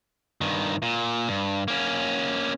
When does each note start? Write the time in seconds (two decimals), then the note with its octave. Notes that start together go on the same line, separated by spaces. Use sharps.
0.41 G2 D#3
0.82 A#2
1.28 G2
1.68 A#3 C#4